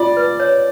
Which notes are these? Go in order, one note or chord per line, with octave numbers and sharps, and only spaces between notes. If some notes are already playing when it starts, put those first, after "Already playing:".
Already playing: F4 D5
B4
C#5